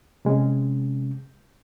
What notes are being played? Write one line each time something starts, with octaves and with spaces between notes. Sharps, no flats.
C3 G#3 C#4